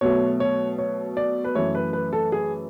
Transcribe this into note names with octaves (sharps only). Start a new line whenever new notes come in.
B2 F#3 A3 C#5
C#5
C#5
D5
B4
F#2 E3 A3 C#5
B4
B4
A4
G#4